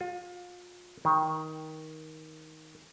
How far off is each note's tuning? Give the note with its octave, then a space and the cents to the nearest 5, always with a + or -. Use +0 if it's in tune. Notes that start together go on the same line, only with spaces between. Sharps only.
F4 +35
D#3 +15